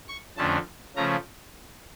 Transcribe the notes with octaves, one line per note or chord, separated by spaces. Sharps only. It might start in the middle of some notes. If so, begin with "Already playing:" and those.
C#6
F2 D3 F3 A3 C#4 A5
C#3 F3 A3 C#4 A#5